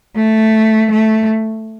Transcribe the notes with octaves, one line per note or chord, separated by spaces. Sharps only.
A3
A3